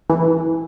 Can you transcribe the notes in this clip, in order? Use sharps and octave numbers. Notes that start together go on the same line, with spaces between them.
E3